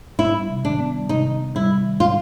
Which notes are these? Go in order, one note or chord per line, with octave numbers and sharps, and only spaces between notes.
B3 E4
G3
C3
D#3 D4
B3
G3
C3 D#4
D#3
B3
G3 E4
C3
D#3
C#4 F4